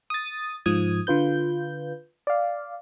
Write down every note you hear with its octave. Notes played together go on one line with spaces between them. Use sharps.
D#6 A6
G#2 F3 D#6 G#6
D3 F4 B4 G6
D5 F5